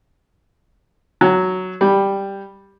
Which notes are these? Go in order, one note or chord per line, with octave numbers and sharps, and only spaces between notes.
F#3
G3